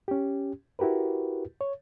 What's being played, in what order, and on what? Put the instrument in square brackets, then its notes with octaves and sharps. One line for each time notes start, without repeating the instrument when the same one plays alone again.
[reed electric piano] C#4 G4
E4 F#4 G4 A#4 B4
C#5